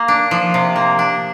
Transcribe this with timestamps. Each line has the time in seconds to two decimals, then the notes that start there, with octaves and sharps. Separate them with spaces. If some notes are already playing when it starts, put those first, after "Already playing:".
Already playing: A#3
0.08 D4
0.31 F3
0.54 C3
0.76 A#3
0.99 D4